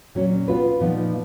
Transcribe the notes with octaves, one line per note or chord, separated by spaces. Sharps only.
A#2 F#3 C#4
B3 F4 B4
A#2 F3 B3 D#4